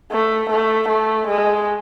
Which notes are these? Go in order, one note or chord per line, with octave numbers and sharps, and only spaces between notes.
A3
A3
A3
G#3